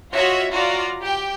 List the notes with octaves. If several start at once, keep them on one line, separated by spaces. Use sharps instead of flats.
F4 F#4 C#5 D#5 E5
F4 F#4 D5 A#5
G4 G5